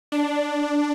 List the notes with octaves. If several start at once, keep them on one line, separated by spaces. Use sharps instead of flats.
D4